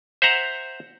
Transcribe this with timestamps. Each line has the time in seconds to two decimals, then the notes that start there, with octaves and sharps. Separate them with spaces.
0.22 C5 E5 F#5 A#5